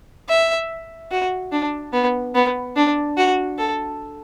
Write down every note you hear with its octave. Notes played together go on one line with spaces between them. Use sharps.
E5
F#4
D4
B3
B3
D4
F#4
A4